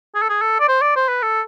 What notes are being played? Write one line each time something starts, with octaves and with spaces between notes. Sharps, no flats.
G#4
A4
G#4
A4
D5
C5
D5
C5
B4
A4